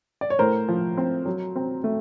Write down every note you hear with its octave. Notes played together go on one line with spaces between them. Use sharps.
D5
C#5
A2 A#4 C5
F3
C4
F#3
C4
A3